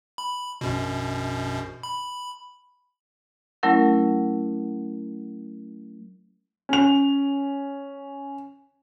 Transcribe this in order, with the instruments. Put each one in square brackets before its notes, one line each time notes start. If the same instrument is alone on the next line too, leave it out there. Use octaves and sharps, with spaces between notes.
[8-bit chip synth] B5
A#1 F#2 B2
B5
[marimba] F#3 A3 C#4 E4 A#4 F#5
[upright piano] C#4 F7